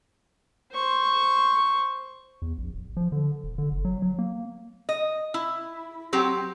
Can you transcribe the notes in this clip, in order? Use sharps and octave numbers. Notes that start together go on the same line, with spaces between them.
C5 C#6
E2
A#1
D1
F3
D3
D#1
D3
F#1
F#3
F#3
A#3
D#5
E4
F#3 C4 G4